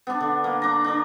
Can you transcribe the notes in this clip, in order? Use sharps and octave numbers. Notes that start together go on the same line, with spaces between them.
B3 D4
D3
A#3
D4 A#5
D4 A#4